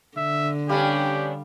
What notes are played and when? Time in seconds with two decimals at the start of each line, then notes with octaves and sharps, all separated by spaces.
0.17 D3 E5
0.69 G3 B3 C#4 D4 G4 F5